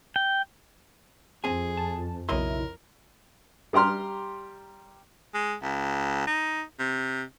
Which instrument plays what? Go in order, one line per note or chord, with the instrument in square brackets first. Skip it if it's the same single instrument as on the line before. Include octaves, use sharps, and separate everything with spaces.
[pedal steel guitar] G5
[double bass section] F2 [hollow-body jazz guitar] C4 G#5 [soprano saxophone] G#4
[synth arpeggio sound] A5
[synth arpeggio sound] B1 E4 [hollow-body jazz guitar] C#3 D#5 C6 [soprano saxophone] A#4
[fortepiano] G3 G4 A#5 C6 F6
[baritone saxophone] G#3
C#2
D#4
C3